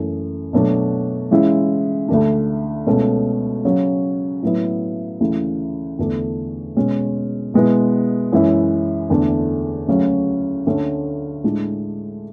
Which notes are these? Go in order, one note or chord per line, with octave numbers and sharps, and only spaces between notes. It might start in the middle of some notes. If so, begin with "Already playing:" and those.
Already playing: F#2 E3 A3
B2 F#3 A3 D4
C#3 E3 G#3 C#4 E4
D2 D3 A3 D4
C#2 B2 A3 C#4
C#3 F#3 C#4
A2 F#3 B3 E4
D2 C#3 E3
E2 D3 A3 D4
B2 G#3 C#4
B2 G#3 B3 E4
F#2 E3 G#3 C#4 E4
E2 D3 A3 D4
D2 C#3 F#3 C#4
D2 D3 A3 C#4
A2 G#3 D4